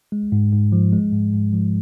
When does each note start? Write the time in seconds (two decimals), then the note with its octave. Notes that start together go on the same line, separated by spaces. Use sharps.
0.12 G#3
0.32 G#2
0.52 G#2
0.72 F3
0.93 G#3
1.12 G#2
1.34 G#2
1.53 F3